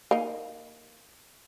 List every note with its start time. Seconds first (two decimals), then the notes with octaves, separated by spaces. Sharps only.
0.11 A#3 D#4